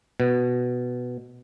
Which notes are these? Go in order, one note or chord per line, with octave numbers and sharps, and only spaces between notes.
B2